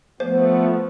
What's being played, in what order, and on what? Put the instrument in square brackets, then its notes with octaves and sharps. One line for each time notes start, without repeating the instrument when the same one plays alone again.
[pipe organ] F3 A3 B3 [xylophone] C5